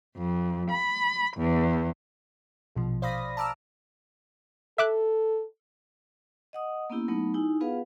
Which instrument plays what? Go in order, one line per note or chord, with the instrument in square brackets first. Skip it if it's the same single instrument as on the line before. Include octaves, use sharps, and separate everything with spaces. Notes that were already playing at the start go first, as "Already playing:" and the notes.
[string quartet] F2
B5
E2
[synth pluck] A#1 B2 F3
C5 D5 F5 B5 D#6 A#6
A5 A#5 D6 E6 F6
[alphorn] A4 [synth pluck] E5 D6 F#6
[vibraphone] D#5 F#5 D#6
A#3 B3 C#4 E4 G4
F#3 A3 B3 D#4
D#4 E4 G4 G#5
B3 F4 G#4 B4 F5 F#5